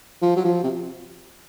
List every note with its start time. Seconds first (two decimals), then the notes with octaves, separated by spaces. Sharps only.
0.22 F3
0.36 F#3
0.45 F3
0.63 C3